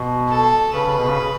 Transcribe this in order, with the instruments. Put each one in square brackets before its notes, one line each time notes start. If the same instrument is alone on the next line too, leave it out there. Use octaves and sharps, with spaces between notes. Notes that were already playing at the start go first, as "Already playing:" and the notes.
Already playing: [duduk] B2
[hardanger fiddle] A4
[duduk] C#3 [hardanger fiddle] B4
[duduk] C#3
B2
C#3
C#3